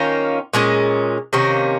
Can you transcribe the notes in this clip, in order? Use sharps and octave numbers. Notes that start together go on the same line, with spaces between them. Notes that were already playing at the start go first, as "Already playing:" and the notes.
Already playing: D#3 A#3 C#4 F4
A#2 G#3 C#4
C3 D#3 A#3 C#4